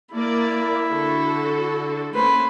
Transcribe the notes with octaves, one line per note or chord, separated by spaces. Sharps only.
A#3 E4 A#4 D5
D3 F#4 A4
A3 A#3 C#4 B4 C5